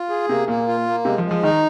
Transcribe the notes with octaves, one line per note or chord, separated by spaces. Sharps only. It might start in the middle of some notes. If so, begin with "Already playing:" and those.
Already playing: F4
G#4
C3 A#3
A#2 A#3
F4
A#3
C3 G#3
F3
G#3
F3
D#3 D#4